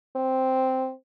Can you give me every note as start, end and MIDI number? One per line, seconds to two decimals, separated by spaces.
0.16 0.91 60